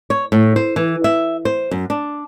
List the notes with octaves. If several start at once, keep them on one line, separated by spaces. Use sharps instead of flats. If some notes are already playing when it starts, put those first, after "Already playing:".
C#5
A2
C5
E3
E5
C5
F#2
D4